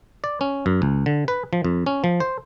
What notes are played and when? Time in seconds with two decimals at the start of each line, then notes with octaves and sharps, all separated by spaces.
0.24 D5
0.41 C#4
0.66 F#2
0.82 C#2
1.06 D3
1.28 B4
1.53 F3
1.64 F2
1.86 C#4
2.04 F3
2.20 C5